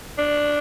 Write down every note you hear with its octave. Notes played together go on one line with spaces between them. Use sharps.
D4